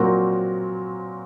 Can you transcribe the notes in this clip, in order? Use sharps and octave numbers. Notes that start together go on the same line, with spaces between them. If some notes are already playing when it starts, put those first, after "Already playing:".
Already playing: A#2 F#3 C4 F#4 A#4